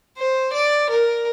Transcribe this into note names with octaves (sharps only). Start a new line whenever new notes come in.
C5
D5
A#4